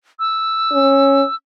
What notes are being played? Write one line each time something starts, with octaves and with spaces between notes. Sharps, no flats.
E6
C#4